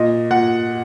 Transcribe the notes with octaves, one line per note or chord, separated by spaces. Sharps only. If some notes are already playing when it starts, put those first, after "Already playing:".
Already playing: A#2 D#5
A#2 F#5